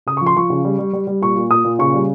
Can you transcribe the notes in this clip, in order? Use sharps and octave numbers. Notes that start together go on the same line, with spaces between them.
C#3 D#6
F3 C#6
C6
F3 C#6
C#3
G3
G3
G3
G3
A#2 C#6
A#2
A#2 D#6
A#2
C#3 C#6
G3